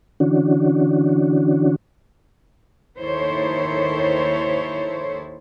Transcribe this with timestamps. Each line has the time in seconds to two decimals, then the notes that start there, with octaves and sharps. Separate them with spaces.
0.20 D3 E3 C#4 D4 F#4
3.00 D#2 D#3 E4 A4 C5 C#5